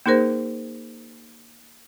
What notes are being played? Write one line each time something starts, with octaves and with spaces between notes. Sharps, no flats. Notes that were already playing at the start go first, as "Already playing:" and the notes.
A#3 D#4 G#4 A#4 C5